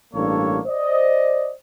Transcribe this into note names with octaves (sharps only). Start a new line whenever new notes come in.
A1 G2 A#3 D4 A4 C#5
C5 D5 D#5